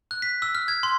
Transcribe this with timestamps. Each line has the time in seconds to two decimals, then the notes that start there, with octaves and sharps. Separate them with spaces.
0.11 F#6
0.22 B6
0.42 E6
0.55 F6
0.68 G#6
0.83 C6